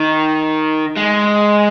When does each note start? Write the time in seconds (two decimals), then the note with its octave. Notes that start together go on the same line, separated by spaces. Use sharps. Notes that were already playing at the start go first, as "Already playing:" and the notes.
Already playing: D#3
0.97 G#3